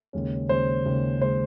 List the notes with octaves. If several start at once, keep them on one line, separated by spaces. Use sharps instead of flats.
D#2 C#3 G#3 C#4
D#2 C#3 G#3 C#4 C5
D#2 C#3 G#3 C#4
C#3 G#3 C#4 C5